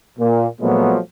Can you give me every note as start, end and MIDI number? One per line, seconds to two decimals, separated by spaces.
0.18 0.46 46
0.61 0.98 46
0.61 0.98 53
0.61 0.98 54
0.61 0.98 56
0.61 0.98 57
0.61 0.98 59